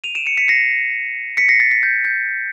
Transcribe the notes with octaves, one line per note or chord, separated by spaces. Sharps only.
D#7 F7
D7 E7
C#7 D#7
B6 C#7
A#6 C7
B6 C#7
A#6 C7
A6 B6
A6 B6
G6 A6
G6 A6